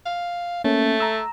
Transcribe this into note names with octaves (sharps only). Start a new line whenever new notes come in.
F5
A3 A#3 C#4
A#5 E6